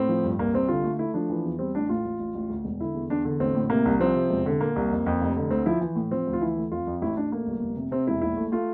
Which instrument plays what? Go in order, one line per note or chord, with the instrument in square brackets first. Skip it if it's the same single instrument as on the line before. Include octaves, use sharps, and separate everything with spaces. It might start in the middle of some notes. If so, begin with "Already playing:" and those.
Already playing: [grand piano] A2 C4
F3
G2
C2 A#3
C2 C4
D3 F4
A3
A3 E4
F3 D4
E3
E2
G3 C4
A1 D4
A2 F4
A1
A1
A1
D2
E1
D3 E4
E2
E2 D4
D3
A1 C4
A2
C3 A#3
C2
F3 C4
C3
E1
D3
A#2 A#3
C2
F2
F2
F1
D3
D2 C4
F3 E4
E3
A2
F3 C4
D2
F4
E3 E4
A3
F2 F4
F2
A1 E4
A1 D4
A3 A#3
G1
F1
C3
C3 C4
E1 E4
A#1 E4
A3
A3 F4